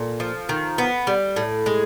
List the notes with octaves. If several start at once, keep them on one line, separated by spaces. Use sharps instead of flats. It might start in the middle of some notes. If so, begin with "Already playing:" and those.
Already playing: A#2 A4
F3
D#3
B3
G3
A2
G#3